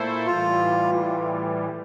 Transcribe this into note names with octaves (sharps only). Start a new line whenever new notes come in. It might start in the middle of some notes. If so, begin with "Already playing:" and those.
Already playing: A#2 A3 E4 A4 C5
A2 E3 G3 F4